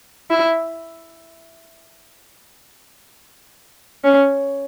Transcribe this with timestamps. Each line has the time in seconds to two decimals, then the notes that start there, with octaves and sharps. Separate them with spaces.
0.31 E4
4.04 C#4